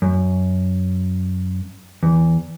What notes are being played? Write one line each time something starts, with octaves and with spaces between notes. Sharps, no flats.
F#2
E2